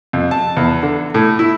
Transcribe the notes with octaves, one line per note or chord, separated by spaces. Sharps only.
F2
A5
E2
D3
A2
E4